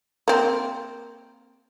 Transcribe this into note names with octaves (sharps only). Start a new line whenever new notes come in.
A#3 C4